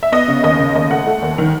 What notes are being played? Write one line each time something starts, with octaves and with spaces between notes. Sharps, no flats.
E5
B3 D#5
C#3
D#2 D#5
C#3
D#2 D#5
A3 F#5
A3
D#2
D#3